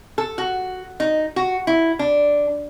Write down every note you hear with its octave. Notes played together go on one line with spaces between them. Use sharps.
A4
F#4
D#4
F#4
E4
D4